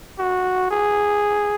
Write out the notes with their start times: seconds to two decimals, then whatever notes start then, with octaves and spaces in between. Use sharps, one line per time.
0.18 F#4
0.71 G#4